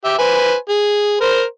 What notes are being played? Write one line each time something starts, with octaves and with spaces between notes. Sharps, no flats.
G4 E5
B4 C5 G#5
G#4
A#4 C5